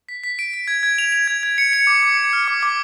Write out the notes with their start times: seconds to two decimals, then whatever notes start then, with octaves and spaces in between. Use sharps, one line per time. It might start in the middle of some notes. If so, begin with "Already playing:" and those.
0.09 B6
0.24 B6
0.39 D7
0.53 D7
0.68 G#6
0.83 G#6
0.98 F7
1.12 F7
1.28 G#6
1.43 G#6
1.58 C#7
1.73 C#7
1.87 D6
2.03 D6
2.18 C#7
2.33 F6
2.48 D6
2.63 D6